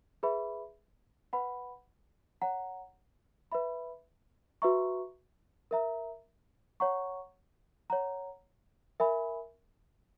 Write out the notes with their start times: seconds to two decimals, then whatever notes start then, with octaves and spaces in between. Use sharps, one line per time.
0.23 G#4 B4 E5 B5
1.33 B4 F#5 B5
2.42 C#5 F#5 A#5
3.52 B4 E5 B5
4.62 F#4 B4 E5 A#5 C#6
5.71 A#4 E5 A#5
6.80 C#5 F#5 A#5 C#6
7.90 C#5 F#5 A#5
9.00 A#4 E5 G#5 B5